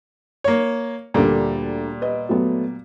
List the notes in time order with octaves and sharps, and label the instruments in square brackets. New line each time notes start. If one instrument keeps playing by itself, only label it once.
[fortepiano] A#3 C#5
[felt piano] D2 A4 A#5 [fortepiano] A#2 G3
[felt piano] B4 D#5
F#3 A3 B3